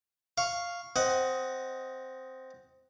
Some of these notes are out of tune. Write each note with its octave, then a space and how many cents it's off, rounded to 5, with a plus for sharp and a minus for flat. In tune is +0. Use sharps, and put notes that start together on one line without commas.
F5 +0 C#6 +0
C4 +0 D#5 +10 F#5 +10